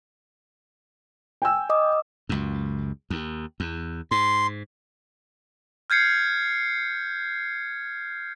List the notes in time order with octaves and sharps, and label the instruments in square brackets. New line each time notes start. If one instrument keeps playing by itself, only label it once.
[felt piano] G5 G#5 E6
[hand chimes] D#5 D6 D#6
[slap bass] C#2 F#2
D#2
E2
[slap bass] G#2 [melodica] C6
[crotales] F6 G6 G#6 C7 C#7